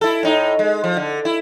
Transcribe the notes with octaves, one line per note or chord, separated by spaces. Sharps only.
E4 A4
A2 D#4
G#3
F3
D3
E4